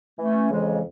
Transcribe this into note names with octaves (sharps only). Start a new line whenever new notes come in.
E3 A3 C#4
F2 C#3 E3 G#3